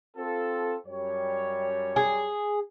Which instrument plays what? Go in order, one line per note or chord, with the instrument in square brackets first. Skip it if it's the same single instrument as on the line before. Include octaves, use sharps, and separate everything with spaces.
[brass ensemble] C4 F4 A4
F#2 G3 C#5
[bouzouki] G#4